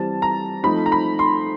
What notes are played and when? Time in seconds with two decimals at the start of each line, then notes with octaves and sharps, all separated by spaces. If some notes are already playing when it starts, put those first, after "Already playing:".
Already playing: E3 G3 C4 A5
0.22 A#5
0.63 F3 A3 C4 D#4 B5
0.86 A#5
0.92 B5
1.19 C6